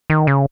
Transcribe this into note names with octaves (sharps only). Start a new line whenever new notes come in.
D#3
C#3